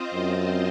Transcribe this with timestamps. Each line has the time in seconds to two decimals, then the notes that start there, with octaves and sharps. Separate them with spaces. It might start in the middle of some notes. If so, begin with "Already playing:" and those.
Already playing: C4 F4 C5 D#5
0.14 F#2